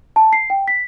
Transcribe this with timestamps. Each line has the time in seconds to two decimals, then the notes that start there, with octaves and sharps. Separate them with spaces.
0.16 A5
0.33 C7
0.50 G5
0.68 B6